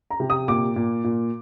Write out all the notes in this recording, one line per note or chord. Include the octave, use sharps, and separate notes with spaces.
A#5
C3
D#6
A#2 D6
A#2
A#2